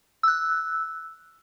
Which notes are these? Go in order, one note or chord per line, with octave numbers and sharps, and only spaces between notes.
E6 F#6